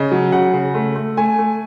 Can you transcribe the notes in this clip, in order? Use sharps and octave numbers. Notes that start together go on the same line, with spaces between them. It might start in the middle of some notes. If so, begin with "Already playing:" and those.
Already playing: C#3 D#5
F#3
C#3 F#5
C#3
A3
A3
A3 G#5
A3